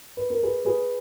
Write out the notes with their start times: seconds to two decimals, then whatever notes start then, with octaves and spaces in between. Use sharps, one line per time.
0.17 B4
0.30 A#4
0.43 G#4 B4
0.65 G#4 B4